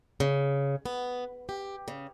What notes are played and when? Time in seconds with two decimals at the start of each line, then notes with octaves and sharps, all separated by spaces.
0.20 C#3
0.85 B3
1.49 G4
1.88 C#3